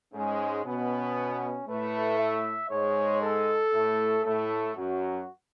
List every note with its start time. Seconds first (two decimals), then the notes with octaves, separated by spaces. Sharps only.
0.13 G#2 G#3 C#4
0.64 B2 B3 C#4
1.67 A2 A3 B4
2.18 E5
2.70 G#2 G#3 C#5
3.22 A4
3.73 A2 A3
4.24 A2 A3 A4
4.76 F#2 F#3 F#4